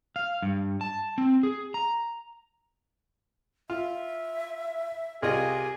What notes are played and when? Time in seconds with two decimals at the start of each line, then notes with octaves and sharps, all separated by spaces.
0.16 F5
0.42 G2
0.81 A5
1.18 C4
1.43 G#4
1.74 A#5
3.70 F4 E5
5.22 C2 F4 G4 G#4 D#5